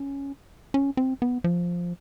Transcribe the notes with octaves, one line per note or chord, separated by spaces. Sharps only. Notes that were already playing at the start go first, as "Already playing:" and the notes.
Already playing: C#4
C#4
C4
B3
F3